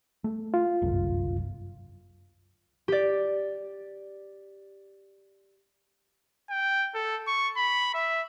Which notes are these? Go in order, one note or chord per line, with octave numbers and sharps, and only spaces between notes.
A3
F4
G1 C2 F#2
G4 D5
G5
A4
C#6
B5
E5